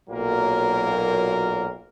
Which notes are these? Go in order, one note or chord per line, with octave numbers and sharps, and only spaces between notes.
B1 A#2 F#3 A#3 A#4